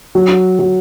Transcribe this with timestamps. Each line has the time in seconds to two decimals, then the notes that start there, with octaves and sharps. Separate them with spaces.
0.15 F#3
0.59 F#3